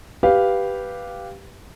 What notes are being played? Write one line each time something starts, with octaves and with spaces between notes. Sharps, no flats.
G4 B4 F5